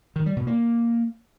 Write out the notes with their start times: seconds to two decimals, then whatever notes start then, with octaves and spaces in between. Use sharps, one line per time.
0.16 D#3
0.26 G3
0.36 B2
0.47 A#3